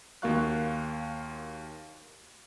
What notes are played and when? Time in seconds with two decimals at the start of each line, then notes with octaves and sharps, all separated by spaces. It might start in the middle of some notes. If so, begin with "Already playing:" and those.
0.22 D#2 A#3 F#4 F5 C#6 F#6